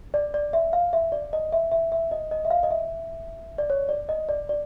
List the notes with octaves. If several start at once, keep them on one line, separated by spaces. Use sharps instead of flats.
D5
D5
E5
F5
E5
D5
D#5
E5
E5
E5
D#5
D#5
E5
F5
D#5
E5
D5
C#5
D5
D#5
D5
D5